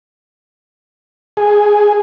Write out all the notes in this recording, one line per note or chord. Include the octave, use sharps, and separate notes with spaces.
G#4